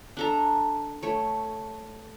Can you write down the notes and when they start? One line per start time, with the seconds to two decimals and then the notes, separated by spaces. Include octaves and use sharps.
0.17 D4 A4 A#5
1.03 A3 C#5